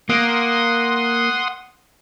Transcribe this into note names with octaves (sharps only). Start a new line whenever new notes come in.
A#3 F#5 C6 D#6